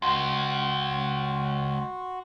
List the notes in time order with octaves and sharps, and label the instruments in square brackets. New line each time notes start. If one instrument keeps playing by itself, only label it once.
[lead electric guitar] C#2 [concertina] F#4 [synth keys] C6